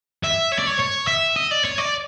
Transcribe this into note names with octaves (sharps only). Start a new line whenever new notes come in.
E5
C#5
D5
C#5
C#5
E5
D#5
D5
C#5
D5